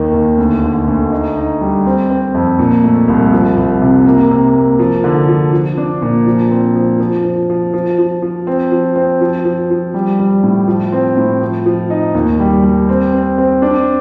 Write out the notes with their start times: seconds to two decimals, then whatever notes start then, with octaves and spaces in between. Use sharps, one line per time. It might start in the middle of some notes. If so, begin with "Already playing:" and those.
Already playing: D#2 D#3
0.14 D#2
0.38 D2
0.63 D3
0.88 D2
1.12 D#4
1.37 D#4
1.61 G3
1.86 C4
2.10 C4
2.34 F2
2.59 A#2
2.84 A3
3.08 C2
3.33 F3
3.57 C2
3.81 C3
4.06 A#3
4.31 C3
4.55 A#3
4.79 F3
5.04 D3
5.28 F3
5.53 F3
5.78 D4
6.02 A#2
6.27 F3
6.51 C4
6.76 F3
7.00 F3
7.24 F3
7.50 F3
7.74 F3
7.98 F3
8.22 F3
8.47 C4
8.72 F3
8.96 C4
9.21 F3
9.45 F3
9.70 F3
9.94 G3
10.19 G3
10.43 A2
10.68 F3
10.92 C4
11.17 A2
11.42 F3
11.66 F3
11.90 D#4
12.15 D#2
12.40 G3
12.64 G3
12.89 C4
13.13 C4
13.38 C4
13.62 D4